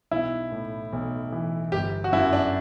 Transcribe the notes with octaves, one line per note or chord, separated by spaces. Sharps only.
B1 E4
A2
B1
E3
G1 G4
F#4
F#2 E4
D4